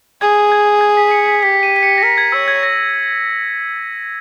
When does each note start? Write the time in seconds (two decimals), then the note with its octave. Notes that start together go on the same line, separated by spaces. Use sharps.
0.21 G#4 G#6
0.52 G#6
0.81 G#6
0.97 B6
1.11 C#7
1.27 B6
1.42 G4 B6
1.63 D#7
1.76 B6
1.83 C#7
1.98 A#6
2.03 A#4 B6
2.18 G#6
2.32 C#5 E6
2.48 G#6
2.63 A#6